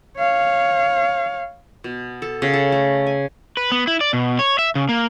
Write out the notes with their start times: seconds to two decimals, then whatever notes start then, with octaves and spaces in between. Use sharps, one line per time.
0.17 C#5 F5
1.84 B2
2.22 A4
2.42 C#3
2.54 A4
2.72 A3
3.07 G#5
3.57 B4
3.72 B3
3.87 E4
4.01 D5
4.13 B2
4.39 C#5
4.59 E5
4.75 C#3
4.89 A#3